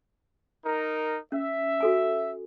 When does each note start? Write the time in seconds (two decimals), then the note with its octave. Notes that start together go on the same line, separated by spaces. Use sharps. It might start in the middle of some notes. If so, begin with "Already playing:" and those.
0.64 D#4 A#4
1.32 C#4 E5
1.80 F#4 A4 G#5